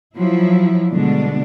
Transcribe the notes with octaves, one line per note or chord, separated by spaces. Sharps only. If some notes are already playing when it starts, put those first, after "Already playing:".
F3 F#3 E4
B2 D3 G3 G#3 D4